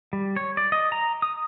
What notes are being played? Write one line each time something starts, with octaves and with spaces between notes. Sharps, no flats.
G3
C#5
D5
D#5
A#5
D#6